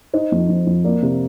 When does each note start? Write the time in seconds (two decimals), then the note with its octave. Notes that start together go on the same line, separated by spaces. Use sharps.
0.13 D#4 C5 D#5
0.32 F2
0.49 F2
0.67 F2
0.84 A#3 D5
1.02 C3